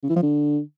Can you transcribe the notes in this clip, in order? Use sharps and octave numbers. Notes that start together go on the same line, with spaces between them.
C#3
E3
F3
D3